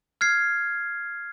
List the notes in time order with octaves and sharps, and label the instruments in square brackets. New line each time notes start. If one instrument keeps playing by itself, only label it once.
[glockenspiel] F6 G#6 C7